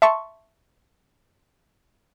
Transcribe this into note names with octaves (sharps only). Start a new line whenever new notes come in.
E5 A5 C6 C#6